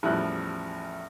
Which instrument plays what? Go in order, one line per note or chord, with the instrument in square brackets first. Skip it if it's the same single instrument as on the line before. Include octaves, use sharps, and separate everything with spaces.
[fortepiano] A1 E2 F3 G3 F#6